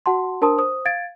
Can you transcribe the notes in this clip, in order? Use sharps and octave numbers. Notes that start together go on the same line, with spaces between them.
F#4 F#5 A5 C6
D4 A#4 C5 A5 C6 D#6
C5 D#6
F5 G#6 A6 D7